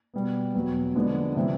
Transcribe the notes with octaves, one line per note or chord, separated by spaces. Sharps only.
B2 G3 B3
E2 B2 F#3 B3
D3 F3 G#3 B3 D4
C3 E3 G3 C4 E4